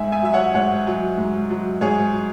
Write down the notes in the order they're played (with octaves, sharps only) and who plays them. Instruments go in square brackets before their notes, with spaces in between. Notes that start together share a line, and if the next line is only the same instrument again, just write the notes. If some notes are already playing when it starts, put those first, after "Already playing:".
Already playing: [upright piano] G#2 E5 G#5
E5 G#5
F#3 E5
C#5 F#5
G#2 C#5 F#5
F#3
G#2
F#3
G#2 G#4 C#5
F#3